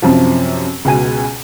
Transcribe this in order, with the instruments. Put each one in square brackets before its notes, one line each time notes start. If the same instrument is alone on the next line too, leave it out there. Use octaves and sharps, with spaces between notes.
[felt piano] F#2 C3 F3
C#2 B2 G#5 D#7